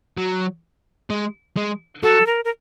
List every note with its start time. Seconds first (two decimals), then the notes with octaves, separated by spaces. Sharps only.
0.18 F#3
1.10 G#3
1.57 G#3
2.03 F#3 A4
2.27 A#4
2.45 A#4